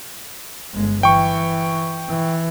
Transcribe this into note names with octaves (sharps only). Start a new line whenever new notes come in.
G1 G#3
E3 G5 C#6
E3